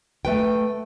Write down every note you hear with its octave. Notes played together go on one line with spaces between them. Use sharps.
A3 B4 G5